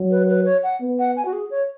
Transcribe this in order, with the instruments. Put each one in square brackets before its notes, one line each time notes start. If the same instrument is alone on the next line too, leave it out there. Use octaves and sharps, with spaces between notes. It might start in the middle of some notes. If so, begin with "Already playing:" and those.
Already playing: [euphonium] F#3
[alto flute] B4
B4
C#5
F#5
[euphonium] B3
[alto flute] F#5
G#5
F#4
G#4
C#5